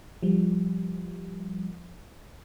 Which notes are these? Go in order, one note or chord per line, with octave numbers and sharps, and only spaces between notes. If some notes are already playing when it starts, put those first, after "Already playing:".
F3 G3